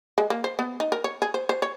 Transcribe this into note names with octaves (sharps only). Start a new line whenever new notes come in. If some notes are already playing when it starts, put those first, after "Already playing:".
G#3
A#3
C5
B3
D#4
A#4
C#5
G#4
C5
C5
C#5